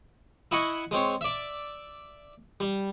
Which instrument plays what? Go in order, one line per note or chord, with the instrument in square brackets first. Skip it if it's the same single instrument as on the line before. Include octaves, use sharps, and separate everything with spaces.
[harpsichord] E4 D#5 F#5 G#5 C#6
G#3 C4 C#5
D5 E5
G3